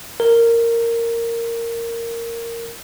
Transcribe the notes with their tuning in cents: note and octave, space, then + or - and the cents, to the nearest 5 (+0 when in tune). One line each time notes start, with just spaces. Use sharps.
A#4 -10